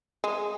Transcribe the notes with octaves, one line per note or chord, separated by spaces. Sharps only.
G#3